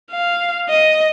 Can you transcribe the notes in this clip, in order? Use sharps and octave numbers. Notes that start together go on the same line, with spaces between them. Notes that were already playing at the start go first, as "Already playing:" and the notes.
F5
D#5